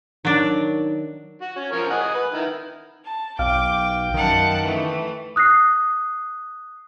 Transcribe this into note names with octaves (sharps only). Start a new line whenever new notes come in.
D#3 F#3 D4
F#4
C#4
F3 A#4 C#5
D#5 F#5 G#5
B4
D#3 E4
A5
B1 F5 G5 D6 F6
F#2 D#3 F#5 A5
E3 A3
D#6 F#6 A#6 C7